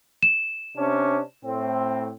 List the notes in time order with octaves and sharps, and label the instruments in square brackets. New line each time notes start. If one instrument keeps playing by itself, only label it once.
[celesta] E7
[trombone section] C3 C#4 D4
A2 C4